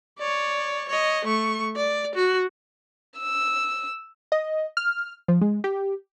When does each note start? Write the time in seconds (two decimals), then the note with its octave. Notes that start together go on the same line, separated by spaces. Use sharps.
0.18 C#5 D5
0.89 C#5 D#5
1.25 A3 C#6
1.76 D5
2.15 F#4
3.19 E6
4.32 D#5
4.77 F6
5.28 F3
5.41 G#3
5.64 G4